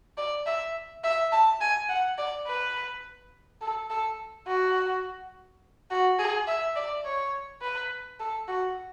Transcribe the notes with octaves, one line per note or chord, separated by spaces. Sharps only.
D5
E5
E5
A5
G#5
F#5
D5
B4
A4
A4
F#4
F#4
G#4
E5
D5
C#5
B4
A4
F#4